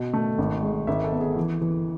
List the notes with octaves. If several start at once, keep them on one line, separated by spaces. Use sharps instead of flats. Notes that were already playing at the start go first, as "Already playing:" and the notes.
Already playing: B2
A3
G#1
G#3
G#1 E5
A4
B3
G#4
E3
E3